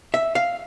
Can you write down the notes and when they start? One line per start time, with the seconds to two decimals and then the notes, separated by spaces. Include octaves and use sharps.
0.14 E5
0.35 F5